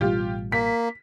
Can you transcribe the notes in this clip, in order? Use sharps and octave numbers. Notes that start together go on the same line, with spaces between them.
A1 B2 G3 F4 G4
A#3 B6